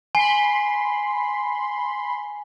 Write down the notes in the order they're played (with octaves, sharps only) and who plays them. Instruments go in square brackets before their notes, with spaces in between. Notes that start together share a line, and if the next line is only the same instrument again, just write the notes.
[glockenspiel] G#5 [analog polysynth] B5 C6